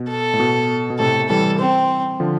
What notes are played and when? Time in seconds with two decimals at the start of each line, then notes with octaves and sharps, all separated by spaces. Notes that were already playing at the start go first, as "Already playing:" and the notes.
Already playing: B2
0.09 A4
0.33 A2
0.40 B2
0.90 B2
0.99 A2 C3 A4
1.29 E3 G3 A4
1.59 C4
2.20 D3 F3